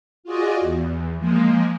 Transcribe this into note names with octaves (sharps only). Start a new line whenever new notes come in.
F4 F#4 G#4 D5 D#5
E2
F3 G#3 A#3